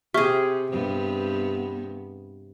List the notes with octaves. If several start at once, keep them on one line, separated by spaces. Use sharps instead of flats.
C3 G4 G#4 E5 C#6 F6
G2 C3 B3